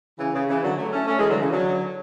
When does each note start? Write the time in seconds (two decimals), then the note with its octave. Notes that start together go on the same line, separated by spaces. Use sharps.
0.19 C#3 E3
0.34 C#3
0.48 C#3 E3
0.63 D3 F#3
0.77 F#3 A3
0.93 A3 C#4
1.08 A3 C#4
1.18 E3 G#3
1.30 D3 F#3
1.40 C#3 E3
1.52 D3 F#3